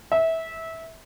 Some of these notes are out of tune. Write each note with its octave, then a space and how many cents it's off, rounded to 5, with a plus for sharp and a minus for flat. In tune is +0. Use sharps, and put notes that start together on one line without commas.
E5 -20